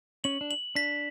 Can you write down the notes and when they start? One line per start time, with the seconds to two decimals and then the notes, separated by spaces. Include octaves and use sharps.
0.24 C#4 F#7
0.41 D4
0.51 F#7
0.75 D4 B6